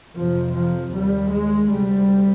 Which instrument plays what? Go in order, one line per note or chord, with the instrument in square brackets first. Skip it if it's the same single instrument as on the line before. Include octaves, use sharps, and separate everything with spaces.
[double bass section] F2 C3 F3
F3
D#2 G3
G#3
D2 C3 G3